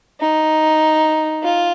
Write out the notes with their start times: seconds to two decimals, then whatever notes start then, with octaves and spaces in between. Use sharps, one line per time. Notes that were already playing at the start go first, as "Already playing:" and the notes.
0.20 D#4
1.43 F4